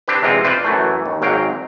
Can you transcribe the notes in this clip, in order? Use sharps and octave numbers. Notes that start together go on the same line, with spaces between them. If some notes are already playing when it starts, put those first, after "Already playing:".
C4 D4 G4 B4
E2 C3 G#3 C4 F4
F4 B4 C5 D5
F#2 E3 A3
D#2
G#1 G#2 F#3 F5 G5